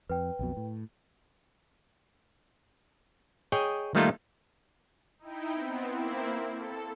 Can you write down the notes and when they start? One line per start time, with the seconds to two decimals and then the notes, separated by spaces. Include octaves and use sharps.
0.09 F2 B4 G5
0.39 B1 F2 B2
0.57 A2
3.52 G#4 C#5 D#5 G5
3.95 D#3 G3 A3 A#3 D#4 F4
5.19 D#4 E4 G5
5.54 B3 C4
5.88 A#3 C4 E4
6.52 A4